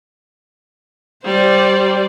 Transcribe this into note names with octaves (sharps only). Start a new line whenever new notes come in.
G3 C5 D5